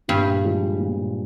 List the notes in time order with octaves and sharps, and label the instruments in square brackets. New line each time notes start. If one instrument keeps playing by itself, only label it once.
[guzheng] G2 [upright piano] A#2
[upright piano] F3 G#3
A#2